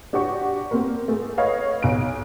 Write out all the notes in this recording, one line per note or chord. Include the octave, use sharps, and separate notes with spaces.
D4 F#4 G4 D5 C#6
A#3 C4
A3 G#4
B4 C#5 D#5 F5
B1 D7